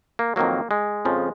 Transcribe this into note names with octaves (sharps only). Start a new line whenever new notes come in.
A#3
F2 D#3 F#3 A#3
G#3
F2 C#3 F3